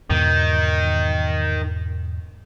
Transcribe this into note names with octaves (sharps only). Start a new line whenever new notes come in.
E2 G#2 B2 D#3